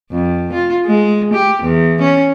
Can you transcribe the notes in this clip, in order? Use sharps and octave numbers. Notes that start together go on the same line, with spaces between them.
F2
F4
G#3
G4
E2
C#4